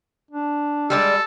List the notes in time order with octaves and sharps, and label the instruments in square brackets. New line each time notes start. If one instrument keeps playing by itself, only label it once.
[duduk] D4
[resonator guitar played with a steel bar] G3 G#3 D5 [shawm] A4